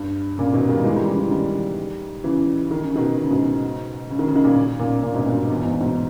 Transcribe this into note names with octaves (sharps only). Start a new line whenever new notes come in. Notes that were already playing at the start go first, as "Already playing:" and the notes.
Already playing: G2
A#2 C#3
B2 D#3
D#3 G3
E3 G#3
D#3 G3
C#3 E3
C#3 E3
D#3 G3
C#3 E3
D#3
C#3
B2 D#3
B2
C#3
G#2 B2
C#3
D#3
C#3
D#3
A#2 C#3
A#2 C#3
A#2 C#3
G#2 B2
G2 A#2
E2
E2 G#2
G#2 B2